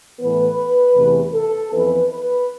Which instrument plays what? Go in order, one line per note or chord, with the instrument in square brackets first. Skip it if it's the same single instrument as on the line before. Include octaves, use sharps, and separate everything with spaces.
[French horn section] A2 E3 B3 B4
E2 C3 E3 A3
A4
F2 E3 B3 B4
B4